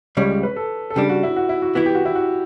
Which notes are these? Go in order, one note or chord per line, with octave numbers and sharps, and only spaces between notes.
C#2 C#3 G3 C#5
B4
A4
A4
C#3 G3 D4 G4
F#4
E4
F#4
E4
F#4
E3 B3 E4 F#4
G4
F#4
E4
F#4